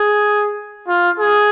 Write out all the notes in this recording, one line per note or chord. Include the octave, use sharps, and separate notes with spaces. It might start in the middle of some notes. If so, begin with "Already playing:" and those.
Already playing: G#4
F4
G#4